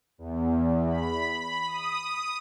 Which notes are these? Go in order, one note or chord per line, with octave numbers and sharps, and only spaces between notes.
E2
B5
B5
D#6